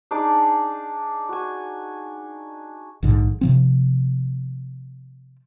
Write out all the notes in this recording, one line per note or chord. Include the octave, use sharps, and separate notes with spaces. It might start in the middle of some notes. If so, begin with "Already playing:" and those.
D4 D#4 G#4 D5
F#4 G#5
A#1 G#2 D3
C3 F3 C4